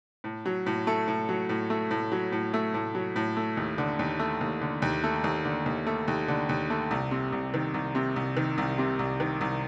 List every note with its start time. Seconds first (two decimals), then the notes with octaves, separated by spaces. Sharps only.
0.24 A2
0.46 F#3
0.66 A2
0.87 A3
1.08 A2
1.29 F#3
1.49 A2
1.70 A3
1.91 A2
2.12 F#3
2.32 A2
2.54 A3
2.74 A2
2.95 F#3
3.16 A2
3.37 A3
3.57 D#2
3.78 D3
3.99 D#2
4.19 A3
4.41 D#2
4.61 D3
4.82 D#2
5.04 A3
5.24 D#2
5.45 D3
5.66 D#2
5.86 A3
6.08 D#2
6.28 D3
6.49 D#2
6.70 A3
6.91 C2
7.11 C3
7.32 C2
7.54 D#3
7.74 C2
7.95 C3
8.16 C2
8.37 D#3
8.58 C2
8.78 C3
8.99 C2
9.20 D#3
9.41 C2